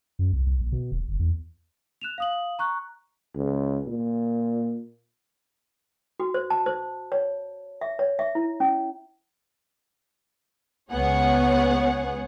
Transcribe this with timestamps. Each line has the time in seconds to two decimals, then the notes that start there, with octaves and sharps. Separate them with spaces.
0.19 F#2
0.33 C2
0.46 C2
0.59 A#1
0.72 B2
0.92 D#1
1.08 G1
1.19 E2
2.01 F#6 E7 F7
2.18 F5 D#6 F#7
2.59 A#5 C#6 F#6
3.35 C#2
3.88 A#2
6.20 F#4
6.34 C5
6.50 A5
6.66 C5
7.12 C#5
7.81 E5
7.99 C#5
8.19 E5
8.35 E4
8.60 C#4
10.92 C#2 B3 G#4 C#5 F#5